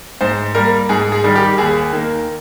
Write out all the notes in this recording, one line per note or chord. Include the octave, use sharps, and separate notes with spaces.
G#2 C5
G3 A#3 A#4
G#2 G#4
G#4
D#3 G3
G4
D#2 G#4
D#3 A#3